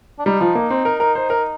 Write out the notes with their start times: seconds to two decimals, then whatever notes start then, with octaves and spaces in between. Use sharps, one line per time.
0.19 D4
0.26 G3 D#4
0.41 F3
0.55 A#3
0.70 C4
0.85 A#4
1.00 A#4
1.15 C5
1.30 A#4